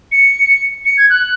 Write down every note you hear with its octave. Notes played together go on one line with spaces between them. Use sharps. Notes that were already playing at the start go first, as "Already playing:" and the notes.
C#7
C#7
G#6
F#6